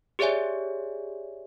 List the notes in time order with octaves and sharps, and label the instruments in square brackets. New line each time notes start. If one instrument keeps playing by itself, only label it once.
[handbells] G4 G#4 C#5 D5 E5 G#5